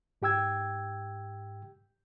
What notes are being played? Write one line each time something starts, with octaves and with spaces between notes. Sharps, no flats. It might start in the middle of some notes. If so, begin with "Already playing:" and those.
G#2 G4 G5 E6 G#6